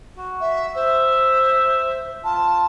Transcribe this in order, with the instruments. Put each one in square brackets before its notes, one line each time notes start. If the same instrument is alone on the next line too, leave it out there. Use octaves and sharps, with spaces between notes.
[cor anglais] F#4
[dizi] E5
[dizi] C5 [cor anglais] E5
[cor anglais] F4 [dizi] A5